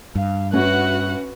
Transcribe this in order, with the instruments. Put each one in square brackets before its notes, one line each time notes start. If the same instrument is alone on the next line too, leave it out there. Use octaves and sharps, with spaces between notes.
[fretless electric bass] G2 [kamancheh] F5
[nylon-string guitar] C#4 [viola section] F#4 B4 F#5 [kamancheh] E5 F#6